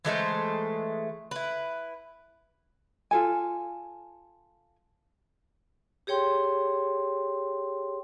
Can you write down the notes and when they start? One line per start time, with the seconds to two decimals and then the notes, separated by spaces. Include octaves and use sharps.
0.05 E3 G#3 A3 C5
1.31 E4 B4
3.11 F4 A4 G#5
6.07 G4 G#4 C#5 G5 C6